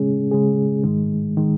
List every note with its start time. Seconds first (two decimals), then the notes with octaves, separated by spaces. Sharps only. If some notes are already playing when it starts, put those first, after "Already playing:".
Already playing: C#3 G#3 C#4 G#4
0.31 C#3 G#3 C#4 G#4
0.84 G#2 D#3 G#3
1.37 D#3 G#3